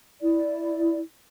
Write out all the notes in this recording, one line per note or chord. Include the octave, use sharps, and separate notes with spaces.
E4 D5